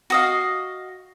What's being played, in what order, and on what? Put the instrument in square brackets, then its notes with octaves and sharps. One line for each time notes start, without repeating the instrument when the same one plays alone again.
[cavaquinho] F#4 D#5 F5